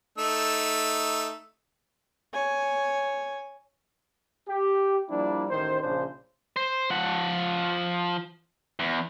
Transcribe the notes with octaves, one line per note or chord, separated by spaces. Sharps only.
A3 D#4 E6
C#5 G#5
G4
F3 G3 A#3 D4 E4
A1 D#3 C5
A#1 C#3 D4 C5
C5
F3 F#5
E2